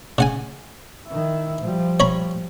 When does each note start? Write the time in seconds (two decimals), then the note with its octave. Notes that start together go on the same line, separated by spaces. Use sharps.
0.18 C#3 F#5 G#5
1.08 D#3 E4
1.62 F3 G3
2.00 C#5 A#5 B5